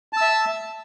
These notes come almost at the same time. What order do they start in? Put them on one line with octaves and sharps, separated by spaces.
A5 E6 E5